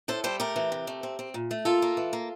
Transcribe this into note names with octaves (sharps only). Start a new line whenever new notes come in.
A2 A4 C5
G3 A4 C5
A3 G4 A#4
E3
C3
A3
C4
C4
A#2
A3
A#3 F4 A4
A#3
E3
A#3